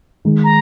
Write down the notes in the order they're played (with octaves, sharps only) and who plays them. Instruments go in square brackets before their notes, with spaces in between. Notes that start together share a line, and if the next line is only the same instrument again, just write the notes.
[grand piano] D#3 G#3 D#4
[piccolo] A#5